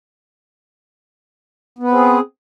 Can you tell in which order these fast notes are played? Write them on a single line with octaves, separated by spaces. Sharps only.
B3 B4 C4 G#4